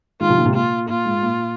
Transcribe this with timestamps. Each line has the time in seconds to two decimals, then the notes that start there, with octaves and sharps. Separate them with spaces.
0.21 D#3 G#3 F4
0.29 C3 F3
0.37 A#2 D#3
0.45 G#2 C3
0.54 A#2 F4
0.88 A#2 F4
1.05 G#2
1.22 A#2